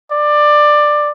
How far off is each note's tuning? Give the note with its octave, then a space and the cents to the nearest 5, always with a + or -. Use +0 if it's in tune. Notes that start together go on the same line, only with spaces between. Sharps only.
D5 +15